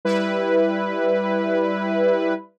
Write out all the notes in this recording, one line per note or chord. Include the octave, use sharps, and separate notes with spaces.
G3 E4 B4